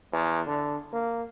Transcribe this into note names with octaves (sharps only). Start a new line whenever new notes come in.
E2
D3
A#3